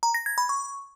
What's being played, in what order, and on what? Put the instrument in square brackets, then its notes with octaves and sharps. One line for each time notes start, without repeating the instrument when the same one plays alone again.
[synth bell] A#5
A#6
G#6
B5
C#6